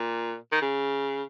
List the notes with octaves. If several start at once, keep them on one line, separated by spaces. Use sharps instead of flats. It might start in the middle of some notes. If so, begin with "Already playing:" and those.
Already playing: A#2
D#3
C#3